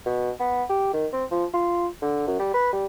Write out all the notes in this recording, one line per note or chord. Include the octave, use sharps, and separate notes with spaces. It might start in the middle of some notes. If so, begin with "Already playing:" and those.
B2
B3
G4
D#3
C4
F3
F4
D3
F#2
G3
B4
G3